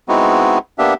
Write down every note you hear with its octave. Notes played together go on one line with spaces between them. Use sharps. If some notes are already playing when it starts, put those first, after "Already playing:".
G#3 B3 C4 D#4 E4 F#4
A#3 B3 D4 G4 E5